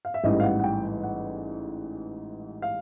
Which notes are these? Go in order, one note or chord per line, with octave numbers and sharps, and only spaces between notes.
F5
E5
A1 G#2 E3 G3 D#5
F5
F#5
F#5
G5
F#5
F5